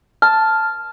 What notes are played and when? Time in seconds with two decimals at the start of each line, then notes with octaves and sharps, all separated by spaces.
0.22 A5 F6